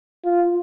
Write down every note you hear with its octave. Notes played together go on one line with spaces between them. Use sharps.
F4